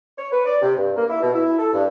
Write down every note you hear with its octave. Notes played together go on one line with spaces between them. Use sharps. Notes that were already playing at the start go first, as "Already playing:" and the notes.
C#5
B4
D5
C3
G2
A#3
E4
B2
E4
A4
G2